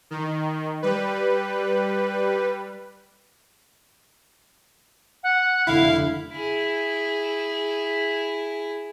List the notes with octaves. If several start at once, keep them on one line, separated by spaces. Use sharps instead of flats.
D#3
G3 B4
F#5
F1 D3 E4 F5
E4 G#4